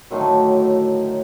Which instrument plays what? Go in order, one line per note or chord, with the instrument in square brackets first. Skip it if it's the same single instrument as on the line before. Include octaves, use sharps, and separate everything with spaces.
[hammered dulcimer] A2 D3 D#3 F#3